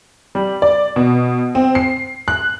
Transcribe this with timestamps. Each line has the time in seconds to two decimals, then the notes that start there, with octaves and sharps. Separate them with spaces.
0.35 G3
0.62 D5
0.96 B2
1.55 C4
1.75 C7
2.28 F#6